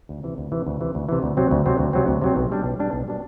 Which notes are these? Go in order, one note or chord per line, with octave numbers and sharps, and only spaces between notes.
D2
C3 E3
D2
C3 E3
D2
C3 E3
D2
C3 E3
D2
C3 F#3 C4
D2
C3 F#3 C4
D2
C3 F#3 C4
D2
C3 F#3 C4
B1
B2 G3 D4
B1
B2 G3 D4
B1
B2 G3 D4